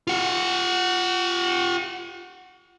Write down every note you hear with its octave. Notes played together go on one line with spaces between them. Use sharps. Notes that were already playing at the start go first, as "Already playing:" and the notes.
F4 F#5